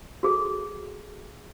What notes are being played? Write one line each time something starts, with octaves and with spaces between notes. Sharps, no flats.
F#4 G#4 A4